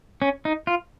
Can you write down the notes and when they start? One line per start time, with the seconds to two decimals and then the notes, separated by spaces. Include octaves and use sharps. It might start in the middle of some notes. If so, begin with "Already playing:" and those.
0.22 C#4
0.45 D#4
0.67 F4